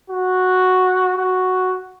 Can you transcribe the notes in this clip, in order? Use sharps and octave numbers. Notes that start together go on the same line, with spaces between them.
F#4
F#4